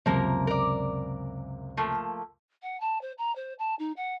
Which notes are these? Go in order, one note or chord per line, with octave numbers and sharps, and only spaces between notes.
C#2 F#2 C3 F3 A#3 A#4
A#4 D5
F3 A3 A#3
F#5
A5
C5
A#5
C5
A5
D#4
F#5